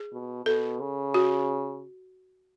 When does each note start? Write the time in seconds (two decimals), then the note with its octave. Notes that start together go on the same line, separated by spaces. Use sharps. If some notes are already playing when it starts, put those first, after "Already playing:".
Already playing: G#4
0.12 B2
0.46 B2 A4
0.80 C#3
1.14 F#4